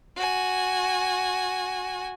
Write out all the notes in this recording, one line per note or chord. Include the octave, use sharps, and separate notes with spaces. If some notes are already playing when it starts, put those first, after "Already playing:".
F#4 G#5